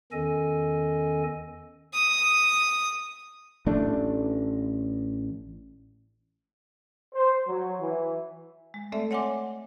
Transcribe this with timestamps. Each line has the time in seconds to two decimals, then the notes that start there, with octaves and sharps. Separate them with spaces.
0.12 E2 D#3 C#4 A4 D#5 G#5
1.94 D#6
3.66 A1 A3 D4
7.15 C5
7.48 F#3
7.81 E3
8.74 G#3
8.92 A3 C4 A4 D5 E5
9.11 C#5 D#5 F#5 G#5 C6 D6